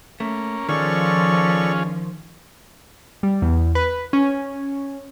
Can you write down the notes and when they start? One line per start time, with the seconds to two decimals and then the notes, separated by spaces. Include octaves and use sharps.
0.20 A3 A#3 C#4
0.69 D#3 F3 C#4 F4 G#4 A4 D5 C#6
3.23 G3
3.42 E2
3.75 B4
4.13 C#4